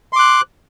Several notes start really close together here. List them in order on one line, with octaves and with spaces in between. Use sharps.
C6 D6 F#6